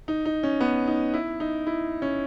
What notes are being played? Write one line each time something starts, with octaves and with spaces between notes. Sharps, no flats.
D#4
D#4
C#4
B3
D#4
E4
D#4
E4
C#4